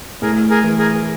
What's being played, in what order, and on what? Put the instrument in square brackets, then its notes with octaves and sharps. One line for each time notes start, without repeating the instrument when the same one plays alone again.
[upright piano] A2 [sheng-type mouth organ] G#4 A#4
[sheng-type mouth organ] G#4 A#4
[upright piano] E3
[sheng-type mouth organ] G#4 A#4